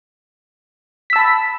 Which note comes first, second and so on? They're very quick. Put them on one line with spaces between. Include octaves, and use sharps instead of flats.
B6 E6 A5 B5